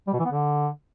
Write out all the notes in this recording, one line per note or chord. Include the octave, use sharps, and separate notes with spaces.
G3
B2
E3
B3
D3